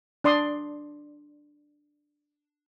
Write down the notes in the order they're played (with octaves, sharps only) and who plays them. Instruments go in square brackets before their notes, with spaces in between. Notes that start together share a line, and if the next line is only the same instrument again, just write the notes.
[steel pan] D4 D5 C6 D#6